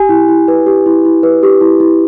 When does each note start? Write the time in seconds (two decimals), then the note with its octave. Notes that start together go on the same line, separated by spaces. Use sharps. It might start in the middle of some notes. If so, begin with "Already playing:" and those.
Already playing: G4 G#5
0.09 E4
0.29 E4
0.48 B4
0.67 G4
0.86 E4
1.05 E4
1.23 B4
1.43 G4
1.61 E4
1.80 E4